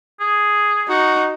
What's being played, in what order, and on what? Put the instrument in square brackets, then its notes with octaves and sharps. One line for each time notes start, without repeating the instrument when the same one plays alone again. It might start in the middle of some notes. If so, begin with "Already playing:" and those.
[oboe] G#4
[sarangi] D#4 [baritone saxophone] F#4